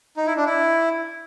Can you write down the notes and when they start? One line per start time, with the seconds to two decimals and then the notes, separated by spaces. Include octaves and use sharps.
0.17 D#4
0.27 E4
0.36 D4
0.46 E4